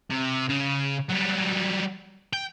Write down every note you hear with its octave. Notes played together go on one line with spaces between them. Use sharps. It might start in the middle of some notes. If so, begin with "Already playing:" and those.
C3
C#3
F#3 G3
G5